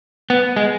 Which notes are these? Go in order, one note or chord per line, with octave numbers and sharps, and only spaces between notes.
B3
G#3